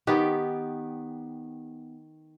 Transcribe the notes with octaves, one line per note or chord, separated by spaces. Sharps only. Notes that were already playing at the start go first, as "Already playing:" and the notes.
D#3 B3 G4